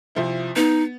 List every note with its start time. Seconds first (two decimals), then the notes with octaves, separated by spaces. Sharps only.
0.15 C2 F3 E4
0.56 B3 D#4